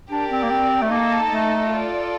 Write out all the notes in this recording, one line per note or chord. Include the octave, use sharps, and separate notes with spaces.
D4 G4 A#4 D5
C4
A#3
C4
A3
A#3 D#4 A4 D#5 A5
A3
F4 A4 D5